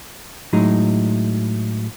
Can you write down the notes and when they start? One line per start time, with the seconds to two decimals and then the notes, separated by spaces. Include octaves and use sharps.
0.53 A2 F#3 G#3 D#4